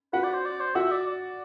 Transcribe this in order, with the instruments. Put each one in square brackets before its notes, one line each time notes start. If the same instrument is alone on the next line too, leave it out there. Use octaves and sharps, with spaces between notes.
[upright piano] F#4 F#5 [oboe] B4
[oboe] D5
C5
D5
C5
[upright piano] F#4 F#5 [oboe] E5
[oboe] D5
D5